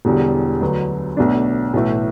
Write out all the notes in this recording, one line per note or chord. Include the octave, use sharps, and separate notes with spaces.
E1 E2 D3 G3
D2 D3 F#3 B3
B1 B2 A3 D4
B1 A2 E3 A3